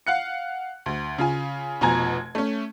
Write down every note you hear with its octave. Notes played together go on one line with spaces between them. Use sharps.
F5 F#5 F#6 C#7
D2
C#3 F4 G#5
F1 B2 F3 G#5 A#5 G#6
A3 C#4